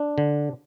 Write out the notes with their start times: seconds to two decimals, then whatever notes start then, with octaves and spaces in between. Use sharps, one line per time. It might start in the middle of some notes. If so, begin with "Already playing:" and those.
Already playing: D4
0.18 D3